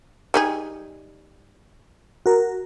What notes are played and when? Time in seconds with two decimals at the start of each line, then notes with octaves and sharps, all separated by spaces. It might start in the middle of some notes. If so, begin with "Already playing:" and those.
0.34 G3 D#4 G#4
2.26 F#4 A#4